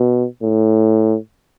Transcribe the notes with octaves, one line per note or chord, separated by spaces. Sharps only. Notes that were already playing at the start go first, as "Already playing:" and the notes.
Already playing: B2
A2